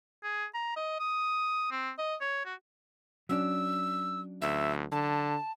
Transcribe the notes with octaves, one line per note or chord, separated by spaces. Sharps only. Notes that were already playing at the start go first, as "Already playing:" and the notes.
G#4
A#5
D#5
D#6
C4
D#5
C#5
F#4
F#3 C#4 D4 E6
D2 E5
D3 A5